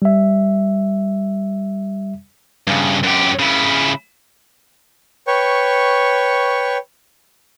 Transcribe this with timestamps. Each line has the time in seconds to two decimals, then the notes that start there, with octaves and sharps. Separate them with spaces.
0.02 G3 E5
2.67 G2 C#3
3.04 F#2 G4
3.40 C#3 E4
5.27 B4 C#5 G5 C#6